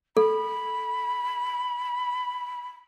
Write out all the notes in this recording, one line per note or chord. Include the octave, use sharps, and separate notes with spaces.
A4 B5